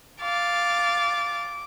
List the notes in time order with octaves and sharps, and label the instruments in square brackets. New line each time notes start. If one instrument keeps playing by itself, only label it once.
[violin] F5 A6 [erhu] D6